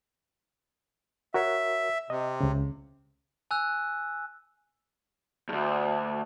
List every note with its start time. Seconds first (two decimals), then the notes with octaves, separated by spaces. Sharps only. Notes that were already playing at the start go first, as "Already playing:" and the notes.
1.34 F#4 A#4 C#5 E5
2.10 C3 D#5
2.41 C#2 C#3
3.51 G#5 E6 F#6
5.49 D2 G2